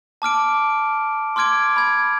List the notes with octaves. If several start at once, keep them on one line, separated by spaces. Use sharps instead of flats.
A5 D6 F6 D7
C6 D6 F6 G#6 D7
B5 G#6